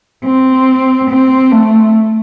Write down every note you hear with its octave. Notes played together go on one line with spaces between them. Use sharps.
C4
C4
A3